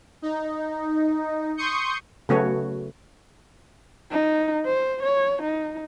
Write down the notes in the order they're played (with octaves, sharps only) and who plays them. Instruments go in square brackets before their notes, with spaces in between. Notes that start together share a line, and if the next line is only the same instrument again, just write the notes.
[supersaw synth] D#4
C6 C#6 D#6 G6 C#7
[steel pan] C#3 F#3 A3 B3 F#4 C#5
[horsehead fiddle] D#4
C5
C#5
D#4